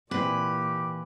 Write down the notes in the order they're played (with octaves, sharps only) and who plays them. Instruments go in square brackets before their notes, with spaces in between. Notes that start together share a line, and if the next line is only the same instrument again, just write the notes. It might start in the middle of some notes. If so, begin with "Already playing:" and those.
[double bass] A#2 [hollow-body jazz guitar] E3 C4 [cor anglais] G4 [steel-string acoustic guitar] B4